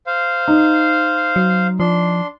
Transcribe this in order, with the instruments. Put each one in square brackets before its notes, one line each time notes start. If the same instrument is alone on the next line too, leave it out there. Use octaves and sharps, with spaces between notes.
[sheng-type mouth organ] C5 F5
[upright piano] D#4
[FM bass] F#3
[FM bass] F3 [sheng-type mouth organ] D4 C6